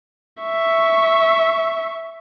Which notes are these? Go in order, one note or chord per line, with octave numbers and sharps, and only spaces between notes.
E5 C#6